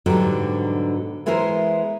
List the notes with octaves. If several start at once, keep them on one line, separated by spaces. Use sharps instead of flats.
G#2 B2 D3 F#3 G3
E3 G#3 B3 E4 A#4 C5